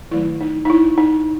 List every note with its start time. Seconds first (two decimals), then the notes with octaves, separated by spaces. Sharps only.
0.11 D#3 F#3 A3 E4
0.41 D#4
0.65 D#4
0.70 E4
0.98 D#4